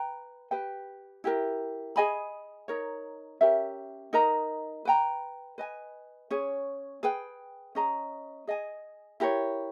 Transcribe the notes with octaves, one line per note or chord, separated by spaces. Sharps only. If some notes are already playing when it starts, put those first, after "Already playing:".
Already playing: B4 G5 A#5
G4 B4 G5
E4 G4 A#4
G#4 D#5 G#5 B5
D#4 A#4 C#5
C#4 G4 A#4 E5
D#4 A#4 D#5 A#5
B4 G5 A#5
B4 D#5 G#5
C#4 G#4 C#5
G#4 B4 G5
C#4 G#4 D#5 A#5
G#4 D#5 G#5
E4 G4 A#4 C#5